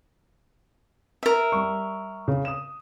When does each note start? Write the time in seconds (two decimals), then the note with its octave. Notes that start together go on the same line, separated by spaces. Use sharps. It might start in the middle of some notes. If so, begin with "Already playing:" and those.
1.23 A#4 E5
1.52 G3 C#6
2.28 C#3
2.45 D#6 E7